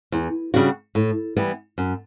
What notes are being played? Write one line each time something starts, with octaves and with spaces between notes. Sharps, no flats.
E2
C#3 G3 D4 F#4
A2
E3 G3 B3
F#2